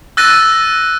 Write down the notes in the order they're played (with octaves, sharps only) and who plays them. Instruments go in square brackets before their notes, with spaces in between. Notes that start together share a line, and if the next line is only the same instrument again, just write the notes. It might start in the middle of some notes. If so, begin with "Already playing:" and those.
[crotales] E6 F#6 A6 A#6 D#7